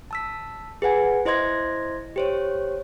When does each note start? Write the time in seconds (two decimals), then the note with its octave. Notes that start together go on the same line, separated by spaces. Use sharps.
0.11 A5 E6 B6
0.82 G#4 B4 F#5 G#5
1.25 E4 C5 D#5 C6 G#6 A#6
2.16 G4 C5 C#5